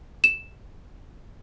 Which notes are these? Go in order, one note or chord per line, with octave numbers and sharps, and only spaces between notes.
E7